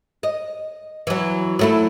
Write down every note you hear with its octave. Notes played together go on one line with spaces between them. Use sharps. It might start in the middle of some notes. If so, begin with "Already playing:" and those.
D#5
E3 F#3
F#3 A3 E4